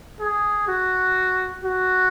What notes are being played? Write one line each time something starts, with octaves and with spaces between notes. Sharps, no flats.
G#4
F#4
F#4